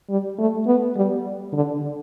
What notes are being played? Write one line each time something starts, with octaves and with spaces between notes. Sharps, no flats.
G3
A3
B3
G3
D3